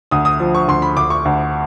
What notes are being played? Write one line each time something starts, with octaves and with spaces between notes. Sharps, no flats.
D2 D#6
D#6
F3
C#6
D2 C6
B5
D2 D6
C#6
D2